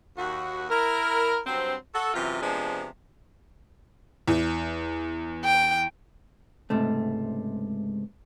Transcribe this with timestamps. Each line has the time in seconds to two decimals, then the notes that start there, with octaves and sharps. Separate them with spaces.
0.18 D#2 F#4
0.70 E4 A#4
1.46 G2 F#3 C4
1.94 F#4 A4
2.14 F#2 C3 E3 F4
2.42 C3 F3 G#3 B3 D4
4.28 E2
5.44 G5
6.70 C#2 G#2 C3 A3